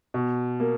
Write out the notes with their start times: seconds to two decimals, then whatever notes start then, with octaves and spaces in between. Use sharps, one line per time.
0.14 B2
0.60 A#3